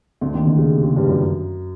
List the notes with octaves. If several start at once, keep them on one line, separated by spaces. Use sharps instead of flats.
D2 D3
D#2 D#3
D2 D3
C#3
C3
C#3
G2 G3
F#2 F#3